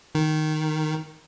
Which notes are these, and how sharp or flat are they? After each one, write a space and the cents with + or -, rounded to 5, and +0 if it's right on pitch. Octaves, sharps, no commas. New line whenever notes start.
D#3 -5